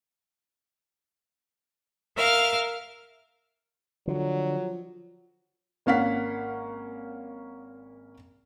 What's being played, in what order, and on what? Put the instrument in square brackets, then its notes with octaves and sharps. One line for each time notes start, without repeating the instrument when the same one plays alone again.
[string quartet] A#4 E5 F5 F6
[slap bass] D3 [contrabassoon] F3 [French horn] F#3
[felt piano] G#1 A#3 C#4 F5 F#5 B6